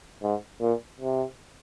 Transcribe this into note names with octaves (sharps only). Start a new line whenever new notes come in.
G#2
A#2
C3